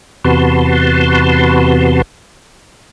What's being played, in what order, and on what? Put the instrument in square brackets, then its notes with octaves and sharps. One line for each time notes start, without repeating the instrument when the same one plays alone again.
[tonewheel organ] E2 C3 F#4 B4 A5 C6